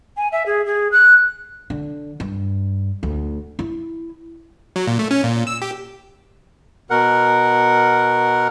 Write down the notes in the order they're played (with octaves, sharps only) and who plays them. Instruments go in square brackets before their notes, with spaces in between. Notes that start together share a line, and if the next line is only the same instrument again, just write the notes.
[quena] G#5
E5
G#4
G#4
F#6
[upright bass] D3
G2
D2
E4
[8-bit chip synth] F#3
A#2
A3
C#4
A#2
E6
G4
[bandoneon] B2 A#4 F#5